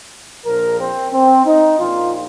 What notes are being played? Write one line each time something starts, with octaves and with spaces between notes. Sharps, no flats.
A#1 A#2 F3 A#4
C4
C4
D#4
A#1 A#2 F3 F4